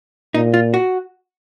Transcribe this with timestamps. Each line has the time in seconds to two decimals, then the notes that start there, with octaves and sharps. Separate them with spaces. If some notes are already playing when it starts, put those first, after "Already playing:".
0.34 A#2 D#4
0.54 F4
0.74 F#4